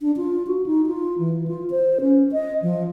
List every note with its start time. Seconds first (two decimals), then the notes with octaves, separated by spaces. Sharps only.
0.01 D4
0.17 F4
0.47 F#4
0.66 D#4
0.87 F4
1.19 E3
1.47 F4
1.70 C5
2.01 C#4
2.32 D#5
2.62 F3